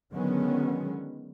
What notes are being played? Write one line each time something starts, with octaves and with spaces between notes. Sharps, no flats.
D3 D#3 F#3 G#3 B3 C#4